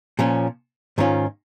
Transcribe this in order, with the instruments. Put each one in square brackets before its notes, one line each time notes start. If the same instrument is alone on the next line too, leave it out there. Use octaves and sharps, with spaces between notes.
[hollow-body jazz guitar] A#2 F3 C#4
G#2 D#3 C#4 F4